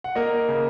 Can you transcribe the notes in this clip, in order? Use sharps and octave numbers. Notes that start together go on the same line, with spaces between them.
F#5
A#3 A#4 D#5
C#3